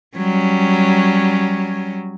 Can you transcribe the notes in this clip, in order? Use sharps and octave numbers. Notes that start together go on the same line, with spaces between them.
F#3 G3 C#4